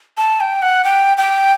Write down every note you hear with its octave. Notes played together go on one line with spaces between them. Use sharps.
A5
G5
F#5
G5
G5